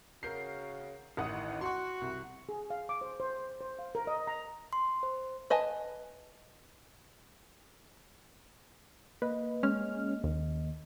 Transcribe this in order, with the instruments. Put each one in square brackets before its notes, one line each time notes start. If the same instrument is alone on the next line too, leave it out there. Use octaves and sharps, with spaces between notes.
[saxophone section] C#3 F#4 [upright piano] A#4 G6 C7
[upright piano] A1 F#5 D#6 [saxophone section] D#3 E4
[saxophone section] F#4 [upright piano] C6 C#6
[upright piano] C2
[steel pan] G#4
F5
D6
C5
C5
C5
F5
A#4
D#5
A#5
[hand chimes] C6
C5
[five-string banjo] B4 D#5 G#5 A5
[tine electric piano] A#3 D#5 [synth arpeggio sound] B4
[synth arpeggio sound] G#3 C#4 F6
D#2